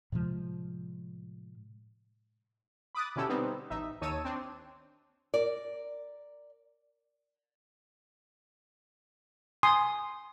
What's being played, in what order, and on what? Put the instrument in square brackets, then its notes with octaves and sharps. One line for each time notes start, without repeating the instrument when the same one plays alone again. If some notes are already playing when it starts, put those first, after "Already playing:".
[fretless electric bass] A2 C3 F3 G#3
[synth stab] B5 D6 D#6 F#6 A6
B2 D3 C#4 E4 G4 A4
G3 B3 C4 D#4
A1 D#4 E5
D#2 D#4 C#5 A5 E6 D#7
C4 D4
[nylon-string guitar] A#4 D5
[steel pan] G#5 C6 D#6